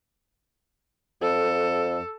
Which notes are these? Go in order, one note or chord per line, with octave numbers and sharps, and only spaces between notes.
F2 A4